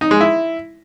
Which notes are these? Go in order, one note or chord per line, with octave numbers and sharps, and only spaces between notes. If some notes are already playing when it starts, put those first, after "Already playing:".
D#4
G#3
E4